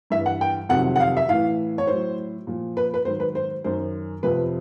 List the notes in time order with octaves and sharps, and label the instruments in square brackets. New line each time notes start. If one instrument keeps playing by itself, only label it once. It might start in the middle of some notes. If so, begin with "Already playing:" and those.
[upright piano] G2 E3 E5
F#5
G5
F2 C3 D#3 F#3 F#5
F#5
F5
E5
A2 E3 F5
C#5
A2 F#3 C5
A#2 F3
B4
B4
G#2 D#3 F#3 C5
B4
C5
F#2 D#3 F#3 C5
F2 C3 F3 B4